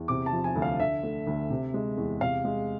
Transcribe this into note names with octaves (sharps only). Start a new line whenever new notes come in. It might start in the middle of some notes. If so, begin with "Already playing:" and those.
Already playing: E2
C3 D6
A5
F3
G#5
D2
F5
D3 E5
A3
D2
C3
G#3
E2
C3 F5
G#3